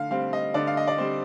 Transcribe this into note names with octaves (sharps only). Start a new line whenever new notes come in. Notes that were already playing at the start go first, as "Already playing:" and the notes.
Already playing: D3 F5
G3 C4 F5
D#5
D3 D5
F5
D#5
D5
G3 C4 C5